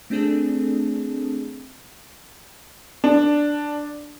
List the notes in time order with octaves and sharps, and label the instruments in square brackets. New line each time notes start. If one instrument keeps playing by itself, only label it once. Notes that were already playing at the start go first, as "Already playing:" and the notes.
[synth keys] A3 C4 D4 G#4 A4
[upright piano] D4